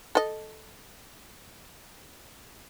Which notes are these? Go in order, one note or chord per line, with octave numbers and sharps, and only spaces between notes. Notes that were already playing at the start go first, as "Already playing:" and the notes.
A4 D#5